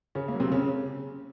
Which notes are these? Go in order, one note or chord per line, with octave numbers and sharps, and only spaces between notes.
C#3 C#4
A#3
F#3
C3 C4
C#3 C#4